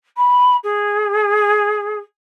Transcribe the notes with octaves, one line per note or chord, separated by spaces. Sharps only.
B5
G#4